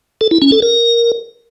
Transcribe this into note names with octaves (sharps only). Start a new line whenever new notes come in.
A4
E4
C#4
A4
A#4